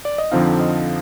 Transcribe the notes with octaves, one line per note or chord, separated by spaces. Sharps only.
D5
D#5
F2 D3 F3 C4 D#4 F5
D#5